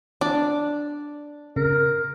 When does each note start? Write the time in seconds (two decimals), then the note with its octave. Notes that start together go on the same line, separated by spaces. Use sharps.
0.21 D4 D5
1.56 C#3 A#4